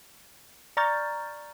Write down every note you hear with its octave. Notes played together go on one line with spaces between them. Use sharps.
D5 A#5 C#6 F6 G6 A6